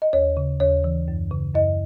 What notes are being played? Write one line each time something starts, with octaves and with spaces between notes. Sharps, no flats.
D#5
D#2 C#5
C#3
D#2 C#5
E3
F#2
C#3
F#2 D#5